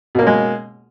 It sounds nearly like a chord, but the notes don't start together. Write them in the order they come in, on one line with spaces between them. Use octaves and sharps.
B2 A#3 C#4 G#3